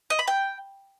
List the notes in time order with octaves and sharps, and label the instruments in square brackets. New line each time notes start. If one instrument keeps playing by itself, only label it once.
[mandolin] D#5
B5
G5